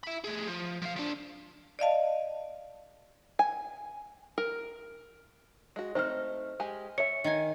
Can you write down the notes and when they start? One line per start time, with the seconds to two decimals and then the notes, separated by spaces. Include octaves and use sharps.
0.04 E5 B5
0.24 A3 G#4
0.47 F3
0.82 F3 F5
0.96 F3 D4
1.79 D5 D#5 F5 A5
3.39 G#5
4.38 A#4
5.76 G#3 F#4
5.95 A3 C4 D#4 C5 F6
6.60 G#3 G4 G#5
6.98 C#5 E5 C#7
7.24 D#3 G#5